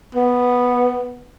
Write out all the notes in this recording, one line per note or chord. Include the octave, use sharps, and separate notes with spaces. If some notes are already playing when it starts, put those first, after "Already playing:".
B3